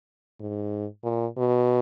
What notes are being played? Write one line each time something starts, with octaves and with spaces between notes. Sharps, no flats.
G#2
A#2
B2